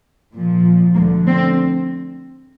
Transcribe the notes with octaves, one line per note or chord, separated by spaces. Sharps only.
A#2 F3
D2 D3 F3 A#3
C4